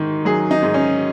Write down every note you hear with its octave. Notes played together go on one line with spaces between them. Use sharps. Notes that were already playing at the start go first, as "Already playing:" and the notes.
Already playing: G#2 D#3
F#3 G#4
D#4
G#2
C#4